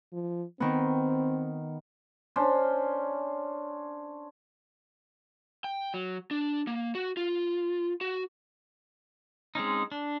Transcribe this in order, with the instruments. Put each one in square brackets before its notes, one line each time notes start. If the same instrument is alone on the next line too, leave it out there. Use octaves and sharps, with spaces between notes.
[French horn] F3
[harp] D#3 B3 [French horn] C4
[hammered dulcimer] C#4 D4 C5
[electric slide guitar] G5
F#3
D4
A#3
F#4
F4
F#4
[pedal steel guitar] G#3 C4 C#4 D#4
D4